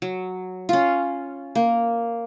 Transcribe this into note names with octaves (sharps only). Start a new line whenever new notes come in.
F#3
C#4 F4
A#3